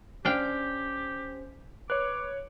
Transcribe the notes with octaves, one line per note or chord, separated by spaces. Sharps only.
C#4 D4 G4 C5 F5 G5
B4 C#5 D6 F#6